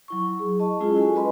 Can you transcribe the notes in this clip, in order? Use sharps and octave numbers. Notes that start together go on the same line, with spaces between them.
F#3 E4 C#6
G#4
D#5 A5 C#6
G#3 C#4 E4 F4 G#4
E4 F#4 A4 G#5
F#4 B4 D#5 B5 C6